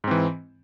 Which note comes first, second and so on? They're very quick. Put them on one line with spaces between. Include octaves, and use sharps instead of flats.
G#2 C4 E3